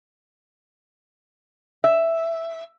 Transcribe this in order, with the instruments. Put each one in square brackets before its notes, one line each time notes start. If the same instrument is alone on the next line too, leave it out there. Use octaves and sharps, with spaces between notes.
[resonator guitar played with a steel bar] E5